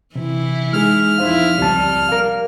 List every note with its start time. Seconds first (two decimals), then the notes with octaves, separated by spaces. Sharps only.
0.15 C3 E3 E4
0.73 G#3 D#4 G#4 F6
1.18 F2 D#4 E4 C5 F5
1.59 C#2 G3 C4 A5
2.09 A#4 F5